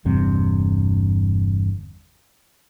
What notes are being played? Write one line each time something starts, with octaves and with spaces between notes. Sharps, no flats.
G1 E2 G2 C3